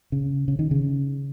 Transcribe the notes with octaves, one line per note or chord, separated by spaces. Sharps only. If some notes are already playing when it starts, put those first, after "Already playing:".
C#3
C#3
D#3
C#3